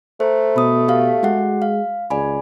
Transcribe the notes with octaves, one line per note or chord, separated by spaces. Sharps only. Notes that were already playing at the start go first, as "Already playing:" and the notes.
A3 C5 A#5
B2 B5 D#6
G4 A4 F5
G#3 F#4 G#4 F#5
F5
C#2 D5 G#5 B5